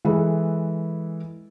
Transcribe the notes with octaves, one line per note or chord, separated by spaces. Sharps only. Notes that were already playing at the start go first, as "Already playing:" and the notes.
E3 G#3 A4 B4